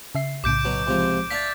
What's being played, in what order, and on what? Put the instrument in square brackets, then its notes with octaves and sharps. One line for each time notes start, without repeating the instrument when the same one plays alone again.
[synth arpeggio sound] C#3 E5 C7
[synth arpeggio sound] B1 A2 C#3 [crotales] D6 G6 D7
[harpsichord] B2 F#3
C#2 C3 F3
[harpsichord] D4 E5 F5 [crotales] A6 B6